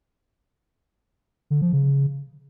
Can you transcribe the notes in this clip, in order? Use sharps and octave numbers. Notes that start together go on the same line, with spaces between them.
D3
F3
C#3